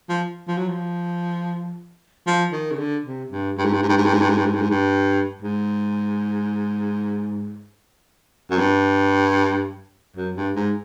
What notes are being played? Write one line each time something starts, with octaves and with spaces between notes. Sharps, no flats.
F3
F3
F#3
F3
F3
D#3
C#3
D3
C3
G2
G2
G#2
G2
G#2
G2
G#2
G2
G#2
G2
G#2
G2
G#2
G2
G#2
G2
G#2
F#2
G2
F#2
G2
G#2